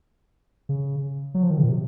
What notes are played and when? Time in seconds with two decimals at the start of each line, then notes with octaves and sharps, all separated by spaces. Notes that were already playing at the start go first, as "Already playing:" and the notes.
0.69 C#3
1.34 F#3
1.43 F3
1.50 D#3
1.58 C#3
1.63 A#2
1.69 C3